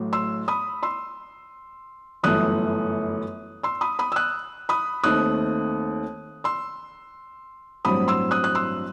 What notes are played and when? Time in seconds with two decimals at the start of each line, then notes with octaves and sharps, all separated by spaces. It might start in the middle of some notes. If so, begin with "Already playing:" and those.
Already playing: A1 A2 F#3
0.13 C6 E6
0.48 B5 D#6
0.83 C6 E6
2.23 G1 F#2 E3 A3 D#6 F#6
3.63 C6 E6
3.81 B5 D#6
3.99 B5 D#6
4.12 E6
4.16 D#6 F#6
4.69 B5 D#6
5.04 D#2 D#3 A3 C4 D#6 F#6
6.44 C6 E6
7.85 A1 G2 F#3 C4 B5 D#6
8.08 C6 E6
8.31 D#6 F#6
8.44 F#6
8.55 C6 E6